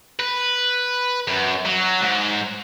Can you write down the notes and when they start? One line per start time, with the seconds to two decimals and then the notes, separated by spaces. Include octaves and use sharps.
0.20 B4
1.27 F#2
1.66 F#3
2.02 G#2